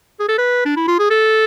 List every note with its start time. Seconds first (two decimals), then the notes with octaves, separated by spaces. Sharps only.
0.20 G#4
0.29 A4
0.38 B4
0.65 D4
0.77 E4
0.88 F4
0.99 G#4
1.10 A4